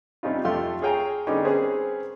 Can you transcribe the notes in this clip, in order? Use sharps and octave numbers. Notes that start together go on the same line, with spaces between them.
C3 G3 C#4 D#4 F4
F2 A3 F4 G4 F5 C6
G#4 C#5 F5 G5 G#5 A#5
D3 G3 B3 C#4 D#4 G#4
C4 C#4 G#4 A#4 B4